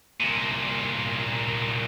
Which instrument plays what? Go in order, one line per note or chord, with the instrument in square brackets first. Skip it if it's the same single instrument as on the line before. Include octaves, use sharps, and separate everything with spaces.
[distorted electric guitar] C2 A#2